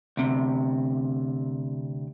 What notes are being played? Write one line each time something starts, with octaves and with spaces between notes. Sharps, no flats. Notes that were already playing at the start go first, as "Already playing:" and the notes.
D2 C3